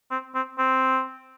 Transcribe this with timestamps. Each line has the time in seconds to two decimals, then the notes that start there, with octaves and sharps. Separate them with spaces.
0.11 C4
0.35 C4
0.58 C4